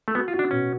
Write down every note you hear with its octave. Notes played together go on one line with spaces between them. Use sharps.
A3
B3 F#4
F4
F#4
D4
B2 C#4